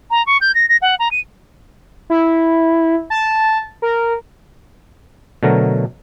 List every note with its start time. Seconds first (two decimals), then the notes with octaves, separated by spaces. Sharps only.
0.11 A#5
0.26 C#6
0.41 G6
0.55 A#6
0.69 A#6
0.82 F#5
0.99 A#5
1.11 D#7
2.10 E4
3.10 A5
3.82 A#4
5.43 B2 D3 F#3 A3 A#4